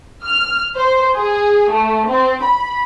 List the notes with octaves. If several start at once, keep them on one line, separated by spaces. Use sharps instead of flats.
F6
C5
G#4
A3
C4
B5